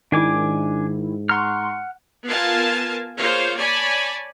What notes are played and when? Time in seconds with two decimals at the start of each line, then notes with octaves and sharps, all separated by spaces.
0.12 G#2 D#3 D4 E4 G#5 D6
1.29 F#5 A#5 C6 C#6 F6
2.26 B3 F4 A#4 F5 G#5 A5
3.18 A#3 F4 G#4 C5 C#5 F5
3.57 C#5 D5 G#5 A5 B5